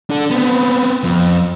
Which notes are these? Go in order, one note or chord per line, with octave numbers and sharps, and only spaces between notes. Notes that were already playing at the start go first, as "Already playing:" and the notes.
D4 A4
B3 C4
F2